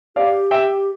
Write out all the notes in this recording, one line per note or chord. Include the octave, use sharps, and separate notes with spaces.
G4 D5 F5
E5 G5